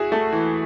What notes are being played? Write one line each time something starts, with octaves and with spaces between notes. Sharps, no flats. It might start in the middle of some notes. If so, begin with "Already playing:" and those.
Already playing: E4 F#4 G#4
A3
E3